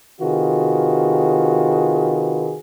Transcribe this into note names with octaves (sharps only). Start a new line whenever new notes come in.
C3 D#3 F4 F#4 G#4 B4